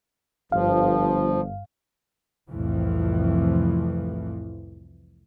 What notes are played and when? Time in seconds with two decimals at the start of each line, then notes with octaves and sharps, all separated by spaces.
0.52 G1 G2 F3 F5
2.49 C2 F2 A2 E3 F3